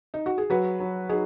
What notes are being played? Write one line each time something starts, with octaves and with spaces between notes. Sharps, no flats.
D#4
F#4
G#4
F#3 F#4 B4
F#3
F#3 D#4 G#4